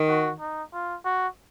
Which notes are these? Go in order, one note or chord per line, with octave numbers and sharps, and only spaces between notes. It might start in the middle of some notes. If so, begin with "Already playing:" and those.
Already playing: D#3
F#4
D#4
F4
F#4